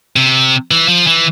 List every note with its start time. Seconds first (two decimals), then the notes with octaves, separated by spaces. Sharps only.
0.16 C3
0.71 E3
0.89 F3
1.07 E3